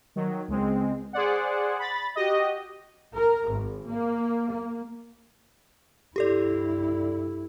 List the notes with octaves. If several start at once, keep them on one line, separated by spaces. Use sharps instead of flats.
D#3 F#3
C#2 G#3 C4
G#4 C5 D5 F#5
B5 A6
F#4 G4 D#5
A#4
G#1
A#3
A#3
G2 E4 G4 A4 D5